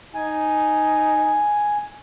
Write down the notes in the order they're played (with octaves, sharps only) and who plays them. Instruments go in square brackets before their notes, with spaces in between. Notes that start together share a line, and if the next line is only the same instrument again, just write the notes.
[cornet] D#4 [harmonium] G#5